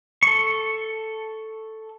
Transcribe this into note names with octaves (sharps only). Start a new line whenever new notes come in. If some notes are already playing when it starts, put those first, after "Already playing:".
A4 C#6